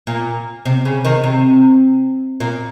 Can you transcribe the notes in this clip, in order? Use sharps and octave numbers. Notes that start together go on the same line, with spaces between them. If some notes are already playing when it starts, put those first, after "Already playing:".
A#2
C3
C#3
C3 D#3
C3
A#2